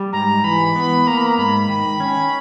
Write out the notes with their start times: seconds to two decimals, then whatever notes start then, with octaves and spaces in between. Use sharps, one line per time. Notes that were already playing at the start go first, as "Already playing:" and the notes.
Already playing: G3
0.13 G#2 A#5
0.44 E3 B5
0.76 B3
1.07 A#3 A#5
1.17 B5
1.27 A#5
1.38 G#2 B5
1.69 D#3
2.00 C#4